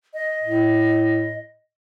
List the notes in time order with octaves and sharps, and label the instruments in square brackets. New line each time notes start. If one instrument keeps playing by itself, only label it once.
[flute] D#5
[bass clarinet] A2